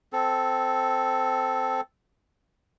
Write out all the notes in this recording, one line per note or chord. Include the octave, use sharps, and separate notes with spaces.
C4 A4